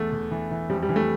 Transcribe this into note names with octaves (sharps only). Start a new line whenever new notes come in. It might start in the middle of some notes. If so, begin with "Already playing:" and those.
Already playing: E2 A3
E2
E3
E3
F2 G3
G3
E3
A3